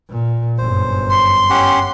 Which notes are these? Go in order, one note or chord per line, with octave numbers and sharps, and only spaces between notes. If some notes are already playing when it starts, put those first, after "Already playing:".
A#2
G1 F#2 C5
C6
C#4 G4 F#5